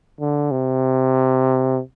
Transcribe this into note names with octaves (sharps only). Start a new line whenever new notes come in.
D3
C3